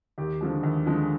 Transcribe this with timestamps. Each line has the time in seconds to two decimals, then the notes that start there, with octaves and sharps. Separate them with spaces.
0.18 D#2 G4
0.41 D3 F3 G#3
0.63 D#2
0.86 D3 F3 G#3